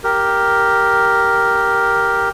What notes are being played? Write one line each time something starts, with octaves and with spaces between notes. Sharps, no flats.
G4 A#4